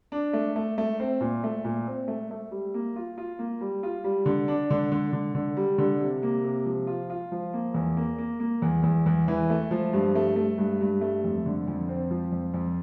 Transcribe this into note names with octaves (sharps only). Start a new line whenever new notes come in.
D4
A3
A3
A3
C4
A#2
A3
A#2
C4
A3
A3
G3
A#3
F4
F4
A#3
G3
F4
G3
D3
D4
D3
D3
D3
D3
G3
D3
C3
A#3
C3
F3
F4
F4
F3
A#3
E2
A#3
A#3
A#3
E2
E2
E2
E3
A3
F3
G2
A3
A3
G2
G2
A3
F2
D3
F2
C4
F3
F2
F2